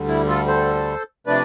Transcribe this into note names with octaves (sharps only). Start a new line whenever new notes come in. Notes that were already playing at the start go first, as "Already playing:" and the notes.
Already playing: D2 D3 G3
E4
F4 A4
A4 C5
C3 F3 A3 D4 B4 D5